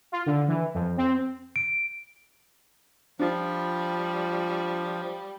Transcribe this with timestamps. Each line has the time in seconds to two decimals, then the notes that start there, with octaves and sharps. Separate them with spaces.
0.12 F4
0.26 D3
0.48 E3
0.74 F2
0.97 C4
1.56 D7
3.20 F3 G3 D4 F4